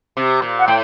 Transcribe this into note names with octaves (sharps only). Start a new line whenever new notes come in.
C3
A#2
F#5
A2 G5